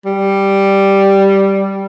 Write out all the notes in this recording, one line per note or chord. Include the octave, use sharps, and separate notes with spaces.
G3